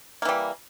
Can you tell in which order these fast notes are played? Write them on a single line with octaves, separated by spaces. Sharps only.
A#3 E3 G3